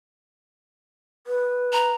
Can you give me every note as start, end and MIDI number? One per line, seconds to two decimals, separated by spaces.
1.27 1.91 71
1.73 1.95 82